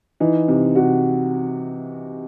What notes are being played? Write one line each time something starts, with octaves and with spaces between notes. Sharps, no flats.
E3 D#4
C3
C3 F#4